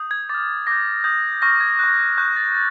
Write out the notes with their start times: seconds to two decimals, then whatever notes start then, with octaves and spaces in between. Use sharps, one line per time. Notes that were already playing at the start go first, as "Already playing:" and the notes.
Already playing: D#6 G6
0.11 G#6
0.29 D6 F6 A6
0.67 D6 G6 A#6
1.04 D#6 G6
1.42 C#6 F6 A#6
1.60 G#6
1.79 C#6 F#6
2.18 C#6 F#6 G6
2.36 A6
2.55 A6